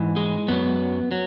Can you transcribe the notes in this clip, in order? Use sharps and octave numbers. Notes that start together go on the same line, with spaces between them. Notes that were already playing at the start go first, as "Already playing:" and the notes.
Already playing: G#2 E3
G#3
F#2 F#3 B3
F#3